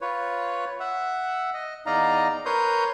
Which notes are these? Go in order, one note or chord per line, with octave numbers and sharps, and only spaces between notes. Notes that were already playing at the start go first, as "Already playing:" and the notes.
F4 B4 C#5
E5 F#5
D#5
E2 D#4 D5 D#5 F5 A#5
A#4 B4 C#5 C6 D#6 G6